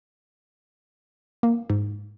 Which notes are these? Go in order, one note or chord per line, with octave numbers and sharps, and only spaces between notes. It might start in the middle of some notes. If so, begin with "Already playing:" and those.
A#3
G#2